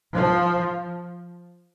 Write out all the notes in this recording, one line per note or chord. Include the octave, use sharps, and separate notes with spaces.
F3